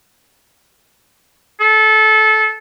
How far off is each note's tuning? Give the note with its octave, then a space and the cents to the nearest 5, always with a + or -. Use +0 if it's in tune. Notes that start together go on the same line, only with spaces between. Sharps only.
A4 -20